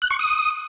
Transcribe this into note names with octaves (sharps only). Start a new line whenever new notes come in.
F#6
C#6
D#6